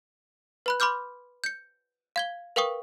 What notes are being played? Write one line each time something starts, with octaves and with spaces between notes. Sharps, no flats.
B4 B5 F#6
B5 C6 D6 F6 G6
G6 C#7
F5 G#6 G7
A#4 B4 F5 G5 C#6 D#6